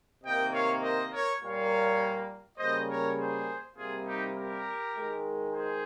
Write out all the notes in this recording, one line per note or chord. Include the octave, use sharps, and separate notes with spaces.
C3 D#3 A#3 D#5 G5
C#5 F5
C5 D#5
A#4 C#5
A#2 G3 A#3 C#5 F5
C#3 G3 A#3 C5 D#5
A#4 C#5
G#4 C5
C3 G3 A#3 F4 G#4
D#4 G4
G4 A#4
D#3 G#3
G#4 C5